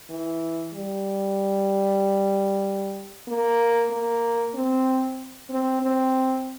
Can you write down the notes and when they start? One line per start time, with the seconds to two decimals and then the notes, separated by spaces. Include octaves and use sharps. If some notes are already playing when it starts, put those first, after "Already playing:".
0.10 E3
0.74 G3
3.28 A#3
3.91 A#3
4.54 C4
5.49 C4
5.82 C4